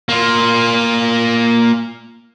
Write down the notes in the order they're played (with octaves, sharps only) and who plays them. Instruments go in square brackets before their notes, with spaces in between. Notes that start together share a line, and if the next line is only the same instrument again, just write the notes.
[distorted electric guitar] A#3 F4